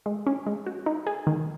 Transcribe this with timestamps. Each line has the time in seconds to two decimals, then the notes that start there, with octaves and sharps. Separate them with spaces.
0.06 G#3
0.27 C#4
0.47 G#3
0.66 F#4
0.86 D#4
1.07 G#4
1.27 D#3